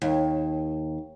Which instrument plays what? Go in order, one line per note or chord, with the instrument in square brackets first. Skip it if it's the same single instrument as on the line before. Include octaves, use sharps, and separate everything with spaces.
[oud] D#2